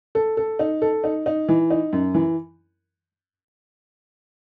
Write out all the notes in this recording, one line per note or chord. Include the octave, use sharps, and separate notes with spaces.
A4
A4
D#4
A4
D#4
D#4
E3
D#4
F#2
E3